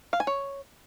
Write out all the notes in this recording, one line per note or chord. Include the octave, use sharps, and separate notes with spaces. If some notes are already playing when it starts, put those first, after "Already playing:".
F5
G#5
C#5